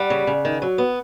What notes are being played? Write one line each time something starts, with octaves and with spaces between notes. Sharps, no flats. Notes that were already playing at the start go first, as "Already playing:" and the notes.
Already playing: G3 F#5
C#3
C#3
D#3
F#3
B3